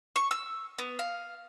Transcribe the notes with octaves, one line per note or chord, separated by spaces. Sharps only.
C#6
E6
B3
F5